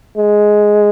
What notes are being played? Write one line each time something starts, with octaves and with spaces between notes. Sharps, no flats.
G#3